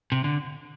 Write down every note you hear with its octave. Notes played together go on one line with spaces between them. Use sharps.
C3
D3